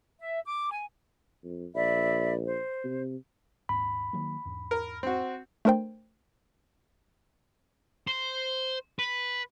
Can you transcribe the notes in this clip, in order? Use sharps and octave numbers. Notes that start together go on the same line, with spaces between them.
E5
D6
G#5
F2
A#1 D5 E5 B5
C5
C3
D#2 G#2 B5
D#3 F#3 A#3
E2 G#2
A#4
C4 F#4
A3 D4 A#4 C5 G5
C5
B4